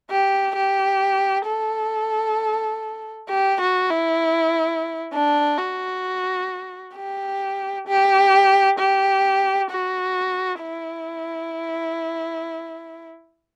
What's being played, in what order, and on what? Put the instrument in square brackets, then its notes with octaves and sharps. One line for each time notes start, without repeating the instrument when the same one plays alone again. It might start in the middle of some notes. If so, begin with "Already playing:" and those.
[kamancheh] G4
G4
A4
G4
F#4
E4
D4
F#4
G4
G4
G4
F#4
E4